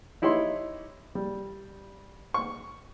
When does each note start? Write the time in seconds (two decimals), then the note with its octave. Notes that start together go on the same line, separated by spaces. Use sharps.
0.22 D#4 E4 G4 C#5 C6
1.15 G3
2.34 C#6